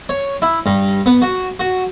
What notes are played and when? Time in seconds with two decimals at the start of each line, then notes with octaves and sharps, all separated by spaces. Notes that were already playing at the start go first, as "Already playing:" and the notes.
0.09 C#5
0.42 E4
0.66 G2
1.06 B3
1.22 F#4
1.60 F#4